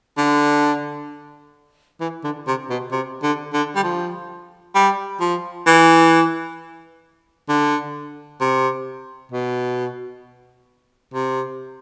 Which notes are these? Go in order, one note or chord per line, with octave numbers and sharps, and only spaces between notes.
D3
E3
D3
C3
B2
C3
D3
D3
G3
F3
G3
F3
E3
D3
C3
B2
C3